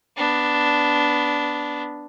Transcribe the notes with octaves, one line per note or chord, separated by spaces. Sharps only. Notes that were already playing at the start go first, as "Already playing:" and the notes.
B3 D4